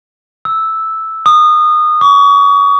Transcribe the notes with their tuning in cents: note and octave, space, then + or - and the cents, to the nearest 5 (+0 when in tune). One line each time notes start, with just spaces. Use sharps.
E6 -5
D#6 -25
C#6 +35